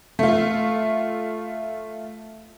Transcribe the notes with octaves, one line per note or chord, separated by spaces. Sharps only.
A3 F4